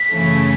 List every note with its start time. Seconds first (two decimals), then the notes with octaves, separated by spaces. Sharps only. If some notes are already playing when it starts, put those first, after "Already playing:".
Already playing: B6
0.11 F#2 C#3 E3 A3 C#4